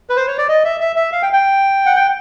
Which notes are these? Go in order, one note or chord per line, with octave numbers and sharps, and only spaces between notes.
B4
C5
C#5
D5
D#5
E5
E5
E5
F5
G5
G5
F#5
G5